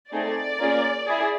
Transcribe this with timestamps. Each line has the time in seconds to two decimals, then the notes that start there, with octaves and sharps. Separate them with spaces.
0.11 A3 C4 D#4 G#4 D5
0.59 A#3 C#4 F4 G#4
1.07 E4 G#4